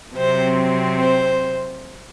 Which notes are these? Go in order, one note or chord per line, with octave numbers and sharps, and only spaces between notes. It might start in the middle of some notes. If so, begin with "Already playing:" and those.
C3 F#3 C4 C5
C5